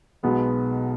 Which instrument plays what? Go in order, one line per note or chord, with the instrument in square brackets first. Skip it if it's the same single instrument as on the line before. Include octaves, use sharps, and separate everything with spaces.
[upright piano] B1 B2 G#3 B3